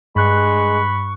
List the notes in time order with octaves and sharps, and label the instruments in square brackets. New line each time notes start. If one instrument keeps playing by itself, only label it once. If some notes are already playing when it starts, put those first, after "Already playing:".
[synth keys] G2 F#6 [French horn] G#3 [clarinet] B5 [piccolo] C#6